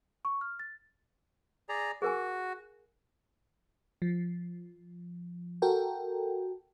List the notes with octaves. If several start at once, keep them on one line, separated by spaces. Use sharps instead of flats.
C#6
F6
A6
G#4 D5 A#5
F#4 G#4 A#4 G#5
F3
F#4 A4 A#4 G5